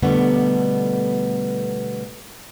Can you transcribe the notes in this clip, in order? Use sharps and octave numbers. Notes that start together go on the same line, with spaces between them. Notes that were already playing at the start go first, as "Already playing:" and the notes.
B2 D3 G3 A3 B3